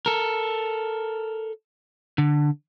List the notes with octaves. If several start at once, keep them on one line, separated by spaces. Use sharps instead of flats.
A4 A#4
D3